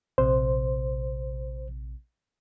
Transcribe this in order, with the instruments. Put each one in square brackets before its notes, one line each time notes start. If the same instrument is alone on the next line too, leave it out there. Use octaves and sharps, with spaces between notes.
[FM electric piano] A#1 C3 [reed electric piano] C5